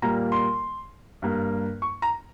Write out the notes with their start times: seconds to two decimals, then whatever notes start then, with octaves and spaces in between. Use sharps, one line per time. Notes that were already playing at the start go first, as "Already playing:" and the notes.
0.02 A#2 G3 A#3 A#5
0.32 C6
1.22 G2 G3 A#3
1.82 C#6
2.02 A#5